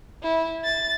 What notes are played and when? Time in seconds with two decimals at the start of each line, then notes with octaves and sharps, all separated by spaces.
0.23 E4
0.64 A6